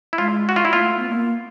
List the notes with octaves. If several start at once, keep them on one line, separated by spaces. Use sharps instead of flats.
E4
G#3 F4
F#4
F4
E4
A#3 F4
A3
B3
A#3